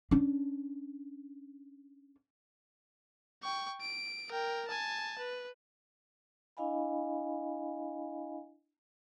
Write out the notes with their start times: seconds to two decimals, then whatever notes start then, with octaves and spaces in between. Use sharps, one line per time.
0.11 C#4 D4
3.43 G5 C#6
3.81 D7
4.31 A#4 G5
4.68 G#5 A5
5.18 B4
6.57 D4 E4 D#5 F5 G#5 B5